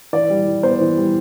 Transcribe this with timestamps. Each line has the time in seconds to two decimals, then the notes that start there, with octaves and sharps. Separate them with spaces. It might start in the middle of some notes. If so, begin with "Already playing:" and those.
0.13 E3 D5
0.30 G3
0.47 E3
0.63 B3 C5
0.80 E3
0.97 G3